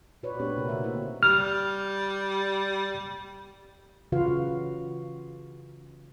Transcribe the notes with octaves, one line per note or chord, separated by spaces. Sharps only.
A#2 F#4 B4 C#5 D5
A3 B3 C4 D4 G4
C3 F#4 A#4
D3 A#3 E5
D#4 E4 A#4 C5
G3 F6
C#3 E3 F4 F#4 B4 F5